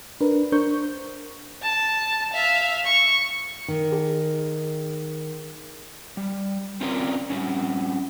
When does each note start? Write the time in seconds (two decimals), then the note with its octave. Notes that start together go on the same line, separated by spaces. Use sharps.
0.21 D4 A#4 B4
0.52 D4 A#4 C5 C#6 G6
1.63 A5
2.33 E5 F5
2.85 C#6
3.68 D#3
3.92 G#4
6.17 G3
6.81 C4 C#4 F4 A#4 C5 D5
7.30 G3 C4 C#4